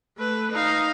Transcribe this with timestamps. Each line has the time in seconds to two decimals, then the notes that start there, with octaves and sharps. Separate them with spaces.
0.18 A3 B4
0.51 D#4 F5